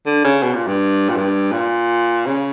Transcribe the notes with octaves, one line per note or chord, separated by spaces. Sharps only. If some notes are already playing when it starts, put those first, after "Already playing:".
D3
C#3
B2
A#2
G2
A#2
G2
A#2
C#3